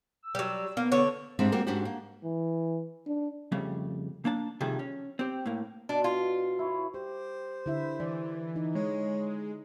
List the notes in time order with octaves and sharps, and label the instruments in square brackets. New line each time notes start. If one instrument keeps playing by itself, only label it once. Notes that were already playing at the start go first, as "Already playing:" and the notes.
[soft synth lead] E6
[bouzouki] F#3 G3
[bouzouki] A#3 [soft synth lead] B3
[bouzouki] D3 C#5
[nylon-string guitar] G#2 G3 G#3 C4 D4 E5
G3 A#3 C4 F#4 A#4
G#2 C#4 D4 F#4 G4
A#3
[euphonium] E3
D4
[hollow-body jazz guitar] F2 C#3 G3 A3
A#3 D4 A5
C3 D#3 F3 G3 G#4 A4
C#4
C4 G4
A2 A#3
[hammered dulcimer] B2 [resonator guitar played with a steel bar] D4
[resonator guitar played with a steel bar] F4
[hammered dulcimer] E4 C#5
[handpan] G4 [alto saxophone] C5
[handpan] D3 E4 E5
[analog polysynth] E3 [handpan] D5
[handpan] D#4
[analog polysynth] G#3 [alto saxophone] C#5